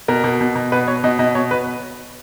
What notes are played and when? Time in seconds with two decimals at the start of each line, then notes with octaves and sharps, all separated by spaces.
0.08 B2 A#4
0.24 B2
0.41 B2
0.55 B2
0.72 B2 B4
0.88 B2 C#5
1.04 B2 D#5
1.19 B2 D#5
1.35 B2 C#5
1.51 B2 B4